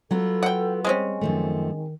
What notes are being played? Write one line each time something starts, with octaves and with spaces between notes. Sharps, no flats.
F#3 B3 F4 A4
F#5 G5
G3 G#3 C4 C#4
F#2 D#3 F3 A3